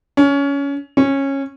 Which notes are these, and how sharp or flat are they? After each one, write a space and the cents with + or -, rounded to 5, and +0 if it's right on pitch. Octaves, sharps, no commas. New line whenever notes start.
C#4 +20
C#4 -15